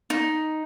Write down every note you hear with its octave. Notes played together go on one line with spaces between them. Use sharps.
D#4